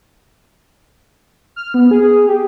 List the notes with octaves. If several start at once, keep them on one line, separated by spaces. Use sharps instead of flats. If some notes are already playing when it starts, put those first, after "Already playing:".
F6
B3
G#4
G4